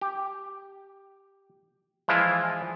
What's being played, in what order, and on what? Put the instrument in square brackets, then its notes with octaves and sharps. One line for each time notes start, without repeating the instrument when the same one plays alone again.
[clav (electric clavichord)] G4
E3 F3 G#3 E4 F4